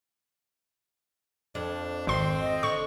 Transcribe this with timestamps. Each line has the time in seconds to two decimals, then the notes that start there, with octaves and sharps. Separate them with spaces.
1.55 F2 D4
2.07 G#1 C4 C6
2.40 D#5
2.63 D3 C#6